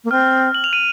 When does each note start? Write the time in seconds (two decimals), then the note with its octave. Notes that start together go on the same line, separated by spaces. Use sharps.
0.04 A#3
0.11 C4 F6
0.54 F#7
0.64 F7
0.73 D#7